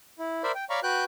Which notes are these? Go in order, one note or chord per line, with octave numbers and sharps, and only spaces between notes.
E4
A#4 C5 D5 E5 B5
G5
C#5 D5 F5 A#5 B5 C#6
F#4 B4 G5 F#6 G6